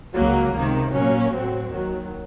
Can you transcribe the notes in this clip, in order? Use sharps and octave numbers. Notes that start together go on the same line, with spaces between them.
C#2 C#3 F#3 A#3
C#2 C3 D#3
A#2 F#3 A#3 C#4
A2 F#3 C4 F#4
D#2 D#3 F#3